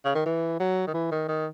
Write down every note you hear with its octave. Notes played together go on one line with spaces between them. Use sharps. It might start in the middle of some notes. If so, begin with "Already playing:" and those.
C#3
D#3
E3
F#3
D#3
E3
D#3
D#3